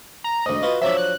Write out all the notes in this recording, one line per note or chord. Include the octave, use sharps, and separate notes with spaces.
A#5
D2 G#2 D#5
F4 F#4 B4
F3 F#3 D4 E5
F#6